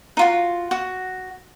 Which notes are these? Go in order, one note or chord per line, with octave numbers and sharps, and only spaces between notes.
D#4 F4 F#4
F#4